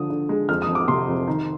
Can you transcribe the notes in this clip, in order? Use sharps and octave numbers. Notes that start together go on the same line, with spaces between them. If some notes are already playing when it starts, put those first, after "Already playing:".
Already playing: D3 F3 D#6
D3
G#3
F2 F6
D#6
F2
D6
C3 C6
F2
D#3